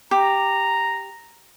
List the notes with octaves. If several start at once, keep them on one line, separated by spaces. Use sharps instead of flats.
G4 A#5